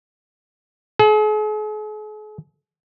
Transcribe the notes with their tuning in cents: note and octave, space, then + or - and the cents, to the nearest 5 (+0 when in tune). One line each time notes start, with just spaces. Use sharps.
G#4 +45